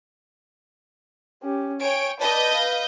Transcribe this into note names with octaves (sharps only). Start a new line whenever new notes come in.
C#4 G4
C#5 G5 G#5 C#6 D7
B4 D5 D#5 A5 G6
F5